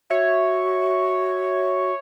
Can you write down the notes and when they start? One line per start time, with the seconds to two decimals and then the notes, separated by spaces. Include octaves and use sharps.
0.10 F#4 C#5 E5